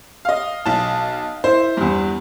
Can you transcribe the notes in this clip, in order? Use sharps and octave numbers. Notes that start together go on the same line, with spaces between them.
D#5 F5
B1 A5
E4 C5
E2 G2